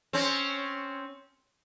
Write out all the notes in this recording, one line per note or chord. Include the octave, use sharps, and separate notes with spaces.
C4 C#4